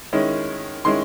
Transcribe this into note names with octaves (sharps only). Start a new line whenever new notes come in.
D#3 G#3 C#4 E4
D#3 G#3 C#4 E4 C6